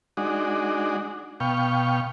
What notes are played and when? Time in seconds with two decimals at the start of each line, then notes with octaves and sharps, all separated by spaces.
0.17 G#3 D4 D#4 F#4
1.40 B2 F5 G5 C#6